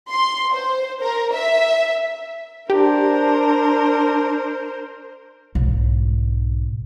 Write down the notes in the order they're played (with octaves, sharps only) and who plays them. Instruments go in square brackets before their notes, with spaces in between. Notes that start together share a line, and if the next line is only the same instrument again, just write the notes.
[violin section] C6
C5
A#4
E5
[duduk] D4 [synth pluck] G4 [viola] A#4 C5
[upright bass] B1 G#2